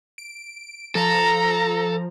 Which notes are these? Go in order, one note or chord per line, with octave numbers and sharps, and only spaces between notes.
D7
F3 A4 A#5